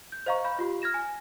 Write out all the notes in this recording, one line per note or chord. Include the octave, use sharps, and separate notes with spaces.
G6
C5 D#5 F5 A#5 C#6
F5 B5 G6
F4 G4
F6 G#6 A#6 E7
G#5